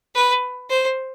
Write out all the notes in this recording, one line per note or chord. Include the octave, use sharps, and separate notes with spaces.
B4
C5